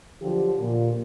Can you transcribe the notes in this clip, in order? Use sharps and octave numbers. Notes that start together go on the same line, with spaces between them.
D3 F3 F#3 F4 G4
A#2